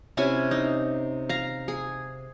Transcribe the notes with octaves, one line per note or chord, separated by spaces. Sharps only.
C3 C#4 E4 G#5
D#4
F5 A#5
G#4